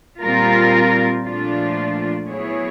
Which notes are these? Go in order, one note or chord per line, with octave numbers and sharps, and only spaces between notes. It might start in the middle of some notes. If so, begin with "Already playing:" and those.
A#2 G3 C4 F4 A#4
A#2 F3 A3 D4 F4
F#3 B3 E4 G#4 C#5